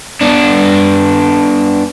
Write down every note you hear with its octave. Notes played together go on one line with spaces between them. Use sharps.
B3 D4